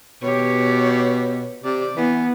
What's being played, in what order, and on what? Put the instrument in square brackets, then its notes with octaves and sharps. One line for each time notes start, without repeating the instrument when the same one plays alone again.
[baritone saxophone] B2 [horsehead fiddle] G4 C#5
[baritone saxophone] C3 [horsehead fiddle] D5
[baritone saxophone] E3 [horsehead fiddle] B3